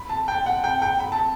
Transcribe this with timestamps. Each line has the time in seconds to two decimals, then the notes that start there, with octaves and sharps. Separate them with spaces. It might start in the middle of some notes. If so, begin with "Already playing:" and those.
Already playing: B5
0.09 A5
0.28 G5
0.46 F#5
0.64 G5
0.82 G5
1.00 B5
1.12 A5